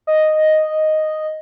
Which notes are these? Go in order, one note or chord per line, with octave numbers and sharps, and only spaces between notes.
D#5